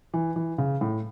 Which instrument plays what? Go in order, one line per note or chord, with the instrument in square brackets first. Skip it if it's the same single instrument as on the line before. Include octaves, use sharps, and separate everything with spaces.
[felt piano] E3
E3
C#3
A2